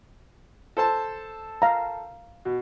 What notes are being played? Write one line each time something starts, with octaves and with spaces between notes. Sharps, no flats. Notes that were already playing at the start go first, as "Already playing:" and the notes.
A4 C5 A5
F5 A#5
B2